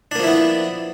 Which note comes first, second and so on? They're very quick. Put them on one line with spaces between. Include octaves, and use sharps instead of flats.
D4 A#3 F3 E4 B3